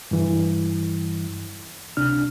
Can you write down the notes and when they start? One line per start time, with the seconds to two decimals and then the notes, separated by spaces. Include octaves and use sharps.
0.11 G2 E3
1.97 C#2 C3 D4 F6